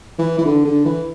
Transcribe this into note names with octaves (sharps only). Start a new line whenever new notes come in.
E3
E3
D3
D3
E3